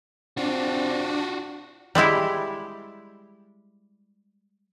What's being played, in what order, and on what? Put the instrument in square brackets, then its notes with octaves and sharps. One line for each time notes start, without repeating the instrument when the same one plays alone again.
[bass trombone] C4 [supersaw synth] D4 [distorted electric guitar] F4 F#4
[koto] G3 G#3 E4 G4